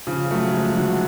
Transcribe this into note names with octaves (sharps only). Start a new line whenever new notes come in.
C#3 F3
F#3 A3
F3 G#3
D3 F#3